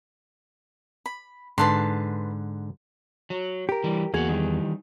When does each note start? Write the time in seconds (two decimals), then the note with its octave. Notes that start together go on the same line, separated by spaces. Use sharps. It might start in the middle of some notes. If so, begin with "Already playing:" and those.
1.06 B5
1.58 G#2 D3 B4 A5 C6
3.30 F#3
3.69 G4 A#4
3.84 E3 G3
4.14 E2 A#3 F#4 G#4
4.28 D#3 E3 G3